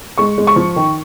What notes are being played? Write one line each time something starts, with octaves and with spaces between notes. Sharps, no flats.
G#3 C#6
G#3
C#6
F3
D#3